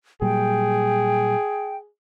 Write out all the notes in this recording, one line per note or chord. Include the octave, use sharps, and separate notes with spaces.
A#2 F#3 G3 G#4 G5